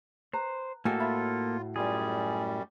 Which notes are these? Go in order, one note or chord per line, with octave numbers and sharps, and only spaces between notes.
B4 C5 A#5
A2 A#3 F#4 A4 D#5 G5 G#5
F4 C#5 E5 B5
F#2 G3 F4 G#4 D5